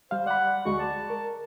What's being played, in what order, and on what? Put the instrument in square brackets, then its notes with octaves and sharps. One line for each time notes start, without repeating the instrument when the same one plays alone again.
[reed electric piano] G3 F5 [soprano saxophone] C5
[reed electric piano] D5 B5 [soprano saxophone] F#5
[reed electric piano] D2 G#3 F#4 [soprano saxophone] C#6
[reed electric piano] D5 [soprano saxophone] A5
[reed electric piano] A#4